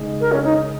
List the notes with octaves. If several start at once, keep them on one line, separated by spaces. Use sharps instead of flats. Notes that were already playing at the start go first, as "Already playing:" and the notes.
Already playing: C#3 G#3 D#4 G#4 D#5
A#4
C#4
D#4